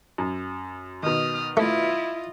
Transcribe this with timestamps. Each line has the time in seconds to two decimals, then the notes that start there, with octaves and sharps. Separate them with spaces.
0.18 F#2
1.03 B2 D#3 D#6 F6
1.57 A3 E4 F4 D#5